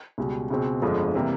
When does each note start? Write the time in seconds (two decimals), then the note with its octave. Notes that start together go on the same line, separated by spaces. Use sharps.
0.18 C#2 B2 G3
0.50 C#2 B2 G#3 C4
0.82 G1 F2 D3 F3 G#3
1.15 C3 E3 G3 A#3